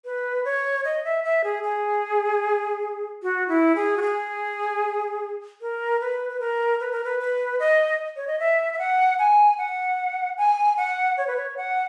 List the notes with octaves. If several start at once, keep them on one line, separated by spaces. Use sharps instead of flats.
B4
C#5
D#5
E5
E5
G#4
G#4
F#4
E4
G#4
F#4
G#4
A#4
B4
B4
A#4
B4
A#4
B4
B4
D#5
C#5
D#5
E5
E5
F#5
G#5
F#5
G#5
F#5
C#5
B4
C#5
F#5